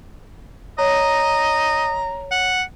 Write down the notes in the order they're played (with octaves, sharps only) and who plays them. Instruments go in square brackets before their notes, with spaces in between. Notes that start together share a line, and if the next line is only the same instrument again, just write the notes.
[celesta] C#5 [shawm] D#5 [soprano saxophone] A#5
[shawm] F#5